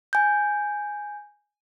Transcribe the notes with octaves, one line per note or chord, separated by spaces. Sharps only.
G#5 G6